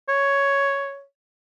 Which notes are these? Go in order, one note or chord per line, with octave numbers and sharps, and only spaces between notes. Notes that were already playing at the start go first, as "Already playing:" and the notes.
C#5